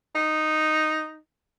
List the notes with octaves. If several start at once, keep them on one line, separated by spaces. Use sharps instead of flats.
D#4